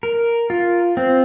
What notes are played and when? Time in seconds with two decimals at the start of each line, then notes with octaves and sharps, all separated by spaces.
0.03 A#4
0.50 F4
0.97 C4